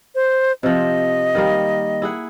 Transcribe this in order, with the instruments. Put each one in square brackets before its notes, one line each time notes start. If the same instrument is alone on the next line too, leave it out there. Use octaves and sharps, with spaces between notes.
[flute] C5
[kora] C3 F3 [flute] D#5
[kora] D#3 G3 A#3
E4 G#4 F#5